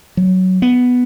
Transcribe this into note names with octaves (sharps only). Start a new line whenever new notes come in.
F#3
B3